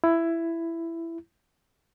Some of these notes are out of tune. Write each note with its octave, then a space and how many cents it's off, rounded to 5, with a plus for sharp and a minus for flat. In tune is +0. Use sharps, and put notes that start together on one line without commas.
E4 +10